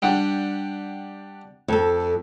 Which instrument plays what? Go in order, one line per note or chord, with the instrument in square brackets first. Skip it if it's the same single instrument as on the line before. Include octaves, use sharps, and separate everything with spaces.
[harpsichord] G3 [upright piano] D4 F#5 G5
[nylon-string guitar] F2 A4